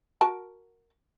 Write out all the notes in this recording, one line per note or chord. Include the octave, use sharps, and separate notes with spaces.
F#4 A#4 A5